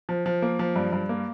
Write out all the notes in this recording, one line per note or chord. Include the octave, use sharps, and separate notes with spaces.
F3
F3
A#3
F3
G2
G2
A#3